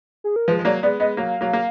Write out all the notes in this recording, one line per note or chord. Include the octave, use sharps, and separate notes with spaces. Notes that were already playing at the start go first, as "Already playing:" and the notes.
G#4
A#4
F3 G#3 B4
G#3
F#3 A#3 D5
G#3 B3 D5
G#3 B3 D#5
F#3 A#3 F5
F#3 A#3
A#3